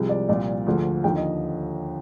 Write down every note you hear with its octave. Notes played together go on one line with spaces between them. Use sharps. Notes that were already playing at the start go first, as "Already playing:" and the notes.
Already playing: C2 C3 F3 G#3
D5
C2 A#2 F3 D5
D2 D3 F3 G#3
D#2 D3 F3 G5
D#5